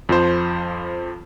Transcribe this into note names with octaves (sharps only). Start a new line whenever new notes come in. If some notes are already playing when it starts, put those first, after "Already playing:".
F2 F3 C5